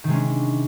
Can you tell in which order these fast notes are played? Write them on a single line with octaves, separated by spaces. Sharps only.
D#3 C3 G#3 C#4 D4